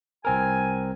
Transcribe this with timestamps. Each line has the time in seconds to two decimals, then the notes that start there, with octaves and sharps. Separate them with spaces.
0.25 C2 C4 A#4 G#5